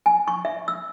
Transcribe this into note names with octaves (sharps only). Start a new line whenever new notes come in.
G#5
C#6
E5
E6